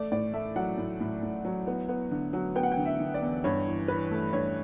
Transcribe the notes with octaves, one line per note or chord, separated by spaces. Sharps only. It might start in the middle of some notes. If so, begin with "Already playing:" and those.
Already playing: A3 D5
A2 D5
A3 E5
F#3 F#5
A2
A2
A2
F#3
B3
B3
D3
F#3
B3 G5
F#5
G5
D3
E5
D3
D5
E2
G2 C#5
E3
E3 B4
A3
G2 C#5